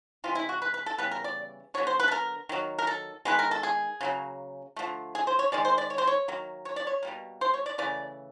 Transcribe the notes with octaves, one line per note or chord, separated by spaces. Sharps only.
C3 E3 G#3 F4
E4
F#4
B4
B4
A4
C#3 E3 G3 B3 B4
A#4
D5
D3 F#3 B3 C#5
C5
B4
A4
A#4
D#3 F#3 A#3
A#4
A4
D#3 G#3 B3 B4
A#4
A4
G#4
C#3 F#3 A#3
D3 F3 A3
G#4
C5
C#5
D#3 G#3 D5
C5
D5
C#5
C5
C#5
D#3 F#3 A#3
C#5
D5
C#5
B2 G3 A#3
C5
C#5
D5
C#3 E3 A3 D5